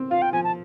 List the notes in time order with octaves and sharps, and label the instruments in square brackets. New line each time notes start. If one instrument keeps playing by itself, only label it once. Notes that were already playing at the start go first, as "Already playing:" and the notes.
Already playing: [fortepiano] C4
[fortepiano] F4 [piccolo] F5
[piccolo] G5
[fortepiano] F3 [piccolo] G#5
[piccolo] A5